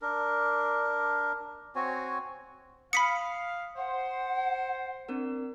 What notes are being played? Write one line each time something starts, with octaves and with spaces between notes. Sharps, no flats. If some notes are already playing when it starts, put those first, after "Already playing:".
D4 A#4
C4 F#4 C#5 G#5
F5 B5 D#6 B6 C#7
C5 F#5
C4 D4 A#4